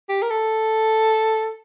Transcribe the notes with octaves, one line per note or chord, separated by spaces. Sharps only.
G4
A#4
A4